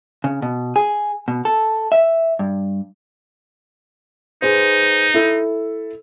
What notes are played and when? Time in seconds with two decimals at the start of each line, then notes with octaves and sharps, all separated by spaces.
0.24 C#3
0.42 B2
0.76 G#4
1.28 B2
1.45 A4
1.92 E5
2.39 G2
4.42 D#4 G#4 B4 C5
5.14 E4 A4